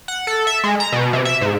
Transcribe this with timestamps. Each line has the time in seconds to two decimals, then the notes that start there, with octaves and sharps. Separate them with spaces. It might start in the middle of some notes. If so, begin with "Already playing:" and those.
0.08 F#5
0.27 A4
0.47 E5
0.64 G#3
0.80 A#5
0.92 B2
1.13 C3
1.25 E5
1.41 G#2